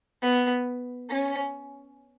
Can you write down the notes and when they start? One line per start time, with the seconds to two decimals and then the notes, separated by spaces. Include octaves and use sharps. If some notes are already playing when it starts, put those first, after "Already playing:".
0.22 B3
1.10 C#4